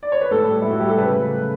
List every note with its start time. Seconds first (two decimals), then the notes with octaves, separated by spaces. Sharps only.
0.03 D5
0.12 C#5
0.21 B4
0.31 A2 A4
0.48 G3
0.62 A2 E4
0.71 F#4
0.80 G3 G4
0.89 A4
0.98 C#3 B4
1.15 F#3 A3
1.32 C#3